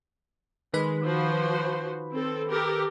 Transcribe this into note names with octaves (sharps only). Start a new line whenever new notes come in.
D#3 G#3 B4 B5
F3 F#4 C5
C4 A4
G4 A4 A#4